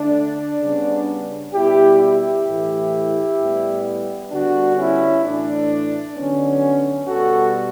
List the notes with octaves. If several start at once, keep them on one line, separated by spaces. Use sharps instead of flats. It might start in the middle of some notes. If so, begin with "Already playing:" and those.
Already playing: D3 A3 D4
C#3 G3 B3
B2 G3 B3 E4 G4
E4 G4
A2 E3 A3
A2 G3 B3
D3 G3 B3 D4 F#4
C#4 E4
A2 E3 A3 D4
D3 F#3 B3 C#4
B2 G3 B3 F#4 A4